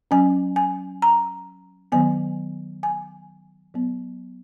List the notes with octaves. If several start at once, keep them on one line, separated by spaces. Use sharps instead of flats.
F#3 C#4 G#5
G#5
A#5
D#3 F#3 B3 G#5
G#5
F#3 B3